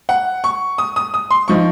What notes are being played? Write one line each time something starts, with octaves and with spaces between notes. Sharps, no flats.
F#5
C#6
D#6
D#6
D#6
C6
F3 C4 D#4 C#6